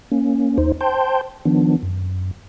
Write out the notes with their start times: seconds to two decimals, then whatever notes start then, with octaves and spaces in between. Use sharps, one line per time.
0.12 A#3 C#4
0.58 D#2 D#4 C5
0.81 C5 G5 A5 C6 G6
1.45 D#3 F3 B3 D4
1.83 F#2